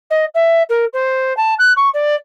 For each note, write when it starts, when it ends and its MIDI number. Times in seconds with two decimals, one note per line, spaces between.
0.10 0.25 75
0.34 0.62 76
0.69 0.85 70
0.93 1.35 72
1.37 1.54 81
1.58 1.72 90
1.76 1.88 85
1.93 2.15 74